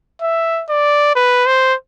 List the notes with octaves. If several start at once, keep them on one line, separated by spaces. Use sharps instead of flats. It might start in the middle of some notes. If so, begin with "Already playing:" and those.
E5
D5
B4
C5